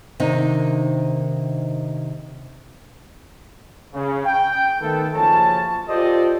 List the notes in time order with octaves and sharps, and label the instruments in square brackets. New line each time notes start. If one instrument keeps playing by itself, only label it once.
[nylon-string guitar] C3 D#3 A#3 D4 D#4 D#5
[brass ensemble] C#3
G5
D#3 A3 B3 A4
F#1 F3 C#4 A5
F4 G4 A4 C5 D5 D#5